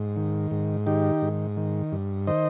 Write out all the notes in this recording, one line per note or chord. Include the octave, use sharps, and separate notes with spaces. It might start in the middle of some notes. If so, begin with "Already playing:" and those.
Already playing: G#2
D#3
G#2
D#3 D#4 G4
G#2
D#3
G2
D#3 C5 D#5